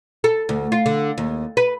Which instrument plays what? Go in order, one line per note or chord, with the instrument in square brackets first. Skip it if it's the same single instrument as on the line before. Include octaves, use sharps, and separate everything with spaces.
[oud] A4
D2
F4
D3
D#2
B4